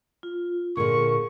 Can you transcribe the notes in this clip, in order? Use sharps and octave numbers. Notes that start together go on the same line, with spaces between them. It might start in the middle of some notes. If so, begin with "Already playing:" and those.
F4
A#2 D3 G#4 A#4 C#6